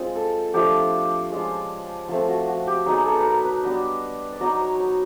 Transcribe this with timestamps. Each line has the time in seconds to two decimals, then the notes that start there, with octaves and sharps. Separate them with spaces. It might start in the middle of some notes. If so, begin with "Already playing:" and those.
Already playing: G#3 C4 F4
0.15 A4
0.54 F3 A3 D4 F4 G4
1.32 G#3 C#4 F4
2.08 F3 A3 C4 F4
2.29 F#4
2.48 F#4
2.67 G4
2.86 F#3 B3 D#4 G#4
3.05 A4
3.19 B4
3.25 A#4
3.45 B4
3.63 G3 B3 D4 D#5
4.32 D5
4.40 F#3 B3 D#4 D#5
4.61 C#5
4.80 C#5